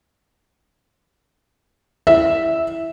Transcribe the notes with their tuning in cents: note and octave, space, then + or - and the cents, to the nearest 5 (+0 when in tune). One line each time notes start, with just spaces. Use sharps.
E4 +0 E5 -10